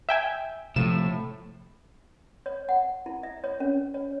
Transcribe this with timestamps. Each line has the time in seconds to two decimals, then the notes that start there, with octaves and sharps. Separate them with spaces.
0.09 E5 G5 G#5
0.76 A2 C3 F3 A3 E7
2.46 C#5
2.69 F#5
3.06 E4
3.23 E5
3.44 C#5
3.60 C#4
3.94 C#5